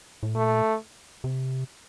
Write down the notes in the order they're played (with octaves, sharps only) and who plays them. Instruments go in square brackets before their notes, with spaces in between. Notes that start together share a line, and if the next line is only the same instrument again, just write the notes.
[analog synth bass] A2
[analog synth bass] A#2 [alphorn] A3
[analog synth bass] C3